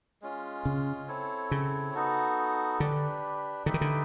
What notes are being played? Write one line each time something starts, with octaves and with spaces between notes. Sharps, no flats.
G#3 C#4 F4
C#3
C4 E4 A4 C#5
C#3
B3 D#4 F#4 A4
D3 D4 G4 B4
D3 D#4 G4 B4 E5
D#3
D3